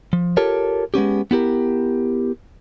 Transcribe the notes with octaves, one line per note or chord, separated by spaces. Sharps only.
F3
F4 G4 A4 A#4 C#5
G#3 B3 C#4 G4
B3 E4 G4 A#4